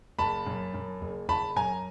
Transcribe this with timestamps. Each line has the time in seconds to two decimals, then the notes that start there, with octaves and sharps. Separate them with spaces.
0.18 F#1 A5 B5
0.46 F#2
0.74 F#2
1.01 F#1
1.28 F#1 A5 B5
1.56 F#2 G#5 A#5